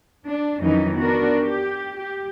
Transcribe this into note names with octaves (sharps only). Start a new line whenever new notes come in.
D4
F2 D#3 E3 F#3 C#4 D#4
B3 D4 F#4 A#4
G4
G4